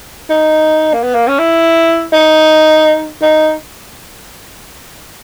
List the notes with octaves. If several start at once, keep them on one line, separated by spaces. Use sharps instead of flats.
D#4
A#3
B3
A#3
C#4
E4
D#4
D#4